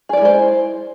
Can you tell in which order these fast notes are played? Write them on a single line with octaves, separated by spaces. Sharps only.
G#4 D5 E4 G#3 C5